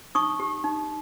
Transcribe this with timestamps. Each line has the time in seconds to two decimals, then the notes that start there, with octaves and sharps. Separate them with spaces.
0.15 D#4 C#6 D#6
0.40 G4
0.64 D#4